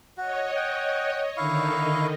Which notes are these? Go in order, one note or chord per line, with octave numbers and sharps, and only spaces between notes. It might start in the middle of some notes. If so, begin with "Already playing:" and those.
F#4 C#5 D#5
F#5 G5
D3 D#3 D#4 E4 F5 C#6